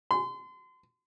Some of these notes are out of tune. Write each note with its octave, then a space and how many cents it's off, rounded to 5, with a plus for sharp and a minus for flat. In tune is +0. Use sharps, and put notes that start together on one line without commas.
C6 -35